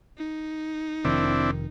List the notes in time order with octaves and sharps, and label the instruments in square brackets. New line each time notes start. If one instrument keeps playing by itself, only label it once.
[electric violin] D#4
[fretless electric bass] F1 D#3 [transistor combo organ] C4 D4 E4